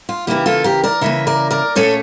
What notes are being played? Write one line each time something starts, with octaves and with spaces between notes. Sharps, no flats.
F4
C#3 E3 A#3 E4 G4
F4 A4
G4 A#4
A#4 D5
C#3 E3 A#3 C#5 E5
A#4 D5
A#4 D5
A#2 A3 C#4 A4 C#5